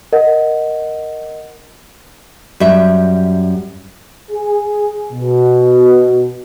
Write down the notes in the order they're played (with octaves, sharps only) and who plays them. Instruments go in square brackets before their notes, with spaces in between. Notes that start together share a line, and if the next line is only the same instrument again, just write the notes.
[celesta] A#4 D#5 F#5
[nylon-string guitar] F#2 G3 E5
[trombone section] G#4
B2